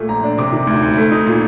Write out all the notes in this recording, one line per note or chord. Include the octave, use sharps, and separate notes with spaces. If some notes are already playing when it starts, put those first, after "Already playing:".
Already playing: A#2 A3
A#1 A#5
D4
C3 D6
D#3
D2
D2
A3
D#4
A#2